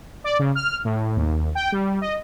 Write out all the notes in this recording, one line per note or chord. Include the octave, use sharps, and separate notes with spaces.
D5
C#3
F6
A2
D#2
G5
G3
D#5